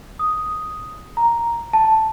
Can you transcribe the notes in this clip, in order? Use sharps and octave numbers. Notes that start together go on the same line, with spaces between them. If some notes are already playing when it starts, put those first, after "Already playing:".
D#6
A#5
A5